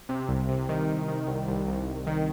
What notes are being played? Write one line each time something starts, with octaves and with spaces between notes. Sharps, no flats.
C3
C2
C3
D#3
D#3
D#3
C2
C2
C2
C2
D#3